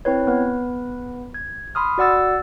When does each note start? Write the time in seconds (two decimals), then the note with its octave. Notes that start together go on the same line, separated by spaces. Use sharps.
0.05 C4 E4 B4 C#5
0.27 B3 B4
1.34 G#6
1.75 B5 C6 D#6 F6
1.98 F#4 D5 F#5 E6 A6